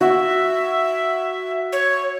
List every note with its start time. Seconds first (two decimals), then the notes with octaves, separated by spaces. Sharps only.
0.01 F#4 E5
1.73 C#5